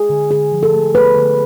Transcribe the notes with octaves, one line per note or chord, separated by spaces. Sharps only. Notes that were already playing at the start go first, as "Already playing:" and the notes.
Already playing: G#4
D3
D3 G#4
F3
A4
A3
A3 B4
D3